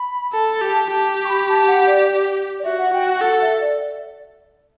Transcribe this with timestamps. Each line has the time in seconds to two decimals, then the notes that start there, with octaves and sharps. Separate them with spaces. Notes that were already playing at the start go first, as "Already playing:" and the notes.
Already playing: B5
0.32 A4 A5
0.61 G4
0.90 G4 A5
1.25 C#6
1.29 B5
1.49 A5
1.67 F#5
1.87 D5
2.60 D5
2.64 F#4 E5
2.78 F#5
2.93 F#4 G5
3.08 F#5
3.21 A4 F#5
3.41 E5
3.61 D5